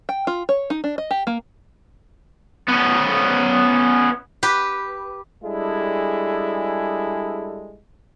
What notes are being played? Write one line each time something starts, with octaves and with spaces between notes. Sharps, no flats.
G5
F4
C#5
D#4
D4
D#5
G4
A#3
B3 C#4
G4 B4
G3 G#3 D4 E4 G#4 A4